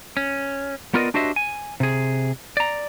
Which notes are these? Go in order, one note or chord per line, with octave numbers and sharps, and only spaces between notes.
C#4
B3 F4 A#4 D5 D#5
D4 F#4 G4 C5 D#5 E5
G#5
C3 G#4
D5 A#5